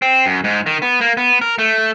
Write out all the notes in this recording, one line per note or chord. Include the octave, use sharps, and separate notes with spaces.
C4
F#2
G#2
D#3
B3
A#3
B3
A#4
A3